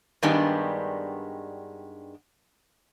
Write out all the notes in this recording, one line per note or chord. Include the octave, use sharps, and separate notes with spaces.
G2 D#3 G3 G#3 B3 D4